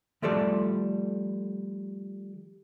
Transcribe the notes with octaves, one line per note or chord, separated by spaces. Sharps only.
D#3 F3 G3 A3 A4 D5